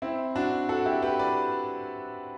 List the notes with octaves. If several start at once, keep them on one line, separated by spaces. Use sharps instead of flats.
C4 E4
D4 F#4
F#4 A4
E4 G4
G4 B4
B4 D5